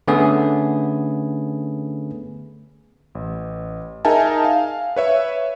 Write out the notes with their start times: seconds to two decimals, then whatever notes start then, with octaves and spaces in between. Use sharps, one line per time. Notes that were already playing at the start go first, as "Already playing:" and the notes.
0.08 D3 A3 B3 C#4 G#4 B4
3.15 A1
4.05 D#4 G#4 A#4 E5 G#5 A5
4.45 F5
4.96 B4 C#5 E5